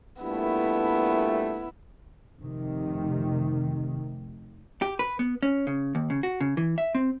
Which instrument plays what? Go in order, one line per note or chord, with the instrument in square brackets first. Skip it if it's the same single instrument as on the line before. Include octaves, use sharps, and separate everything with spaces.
[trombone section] G2 A#2 A3 [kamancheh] B3 E4
[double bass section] F1 C3 D#3
[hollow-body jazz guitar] G4
B4
B3
C#4
C#3
D#2
C#3
F#4
C#3
E3
E5
C4